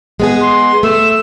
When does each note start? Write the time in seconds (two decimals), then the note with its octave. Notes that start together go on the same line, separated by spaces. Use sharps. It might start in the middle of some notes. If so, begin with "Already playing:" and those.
0.20 G#3 B3 G#4
0.41 C6
0.83 A3 E6